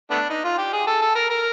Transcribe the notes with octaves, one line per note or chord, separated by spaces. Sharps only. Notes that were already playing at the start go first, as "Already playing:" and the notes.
A3 B3 D4
D#4
F4
G4
G#4
A4
A4
A#4
A#4